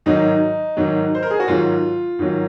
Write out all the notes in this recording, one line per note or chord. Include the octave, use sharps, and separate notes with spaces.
G#2 D#3 F#3 D#4
G#2 D#3 F#3
C5
A#4
G#4
F#4
G#2 D#3 F#3 F4
G#2 D#3 F#3